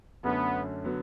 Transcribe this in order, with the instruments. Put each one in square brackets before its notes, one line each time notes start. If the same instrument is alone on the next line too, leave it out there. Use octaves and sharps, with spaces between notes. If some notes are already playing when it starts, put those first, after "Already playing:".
[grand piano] F#2 D3 A3 C#4 [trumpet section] B3
[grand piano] D3 F#3 B3